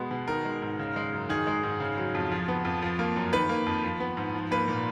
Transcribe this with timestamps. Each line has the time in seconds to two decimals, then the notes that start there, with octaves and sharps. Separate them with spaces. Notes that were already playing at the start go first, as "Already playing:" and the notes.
Already playing: B2 G#3 B3
0.11 B2
0.28 D#3 A#4
0.45 G#3
0.62 G#2
0.79 C#3
0.96 G#3
1.13 F#2
1.29 D#3 G#4
1.47 G#3
1.63 G#2
1.80 C#3
1.97 F#3
2.15 F2
2.31 F3
2.48 B3
2.65 F2
2.82 F3
2.99 A#3
3.16 F#2
3.33 D#3 B4
3.49 A#3
3.66 F2
3.84 F3
4.00 B3
4.17 G#2
4.34 F3
4.51 A#3 B4
4.68 A#2